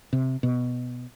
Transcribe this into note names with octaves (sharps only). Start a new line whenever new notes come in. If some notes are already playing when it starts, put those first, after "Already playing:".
C3
B2